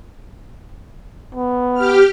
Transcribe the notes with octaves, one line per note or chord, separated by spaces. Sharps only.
B3
G4 F6